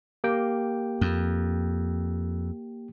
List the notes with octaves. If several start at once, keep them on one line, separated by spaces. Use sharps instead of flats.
A#3 G4 G5
F2